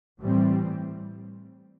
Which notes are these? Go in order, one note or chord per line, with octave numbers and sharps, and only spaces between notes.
A2 E3 G3 C4